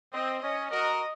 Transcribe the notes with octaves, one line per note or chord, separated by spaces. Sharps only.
C4 D#5
C#4 D#5
F#4 A#4 D#5